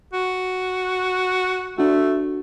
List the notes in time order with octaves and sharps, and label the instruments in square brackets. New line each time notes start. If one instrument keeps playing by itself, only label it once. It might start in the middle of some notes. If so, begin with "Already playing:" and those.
[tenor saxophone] F#4
[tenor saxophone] A3 [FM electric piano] D4 F#4